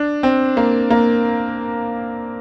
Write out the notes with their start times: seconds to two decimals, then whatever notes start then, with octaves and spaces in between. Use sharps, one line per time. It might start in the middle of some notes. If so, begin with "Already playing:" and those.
Already playing: D4
0.23 C4
0.57 A#3
0.90 A#3